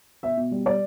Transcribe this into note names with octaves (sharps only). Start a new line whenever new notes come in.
B2 E5
B2
G3
G3 D5